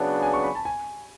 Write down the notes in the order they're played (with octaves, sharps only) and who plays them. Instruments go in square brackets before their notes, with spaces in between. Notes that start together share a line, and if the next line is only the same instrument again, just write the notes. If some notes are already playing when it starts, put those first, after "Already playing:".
Already playing: [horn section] C#3 F#3 B3 D4
[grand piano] G#5
C#6
B5
A5
G#5